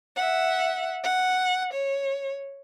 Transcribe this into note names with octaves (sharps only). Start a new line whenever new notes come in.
E5 F#5
F#5
C#5